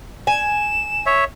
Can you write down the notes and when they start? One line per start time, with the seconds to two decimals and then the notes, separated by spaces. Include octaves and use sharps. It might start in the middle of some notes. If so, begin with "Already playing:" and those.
0.27 G#5 E7
1.06 C#5 E5